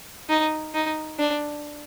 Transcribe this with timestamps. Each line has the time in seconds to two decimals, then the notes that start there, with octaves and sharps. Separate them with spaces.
0.29 D#4
0.74 D#4
1.19 D4